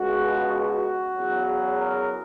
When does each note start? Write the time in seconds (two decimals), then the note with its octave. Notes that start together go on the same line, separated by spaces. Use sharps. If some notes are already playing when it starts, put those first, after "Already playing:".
Already playing: C#2 B2 G#3 F#4
0.53 F#4
1.14 E2 C#3 F#3
1.77 A#4